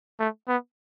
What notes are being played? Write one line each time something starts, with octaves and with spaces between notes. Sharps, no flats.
A3
B3